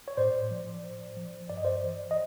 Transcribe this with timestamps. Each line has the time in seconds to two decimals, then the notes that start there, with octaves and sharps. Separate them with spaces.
0.08 C#5
0.17 A2 C5 D5
0.51 F3
0.83 A2
1.16 F3
1.50 G2 D5
1.58 D#5
1.65 C5 D5
1.83 E3
2.11 D#5